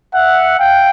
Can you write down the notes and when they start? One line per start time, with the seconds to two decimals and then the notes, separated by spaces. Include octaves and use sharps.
0.15 E5 F#5
0.59 F5 G5